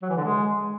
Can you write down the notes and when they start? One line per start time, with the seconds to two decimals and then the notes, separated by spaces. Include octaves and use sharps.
0.02 F#3
0.10 E3
0.17 D3
0.24 G#3